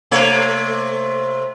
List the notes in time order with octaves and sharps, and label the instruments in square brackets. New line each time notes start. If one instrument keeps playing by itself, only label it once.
[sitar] C3 A3 C#5